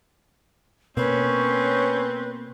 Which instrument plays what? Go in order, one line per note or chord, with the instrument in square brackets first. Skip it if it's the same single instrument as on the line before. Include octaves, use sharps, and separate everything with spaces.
[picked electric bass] B2 A#3 [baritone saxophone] C4 [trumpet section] C#4 C#5 [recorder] B4